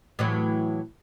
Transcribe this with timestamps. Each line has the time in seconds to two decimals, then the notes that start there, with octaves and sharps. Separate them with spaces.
0.19 A2 E3 F#3